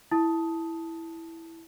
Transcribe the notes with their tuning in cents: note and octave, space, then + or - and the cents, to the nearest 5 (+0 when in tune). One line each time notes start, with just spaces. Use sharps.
E4 +0 A5 +0 D#6 +10